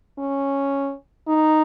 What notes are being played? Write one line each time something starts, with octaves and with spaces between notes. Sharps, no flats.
C#4
D#4